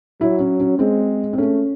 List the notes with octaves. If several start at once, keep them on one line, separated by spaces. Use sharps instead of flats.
F#3 E4
C#4
C#4
G#3 C4
C4
A3 C#4